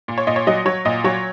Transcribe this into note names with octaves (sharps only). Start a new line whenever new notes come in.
A#2
C#5
A#2 D#5
C#5
F#3 D#5
F#3 C#5
A#2 D#5
F#3 C#5